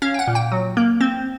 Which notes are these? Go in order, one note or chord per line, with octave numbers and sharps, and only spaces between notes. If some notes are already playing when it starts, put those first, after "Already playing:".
C#4 F5
G5
F#5
A#2
G5
F#3
A#3
C4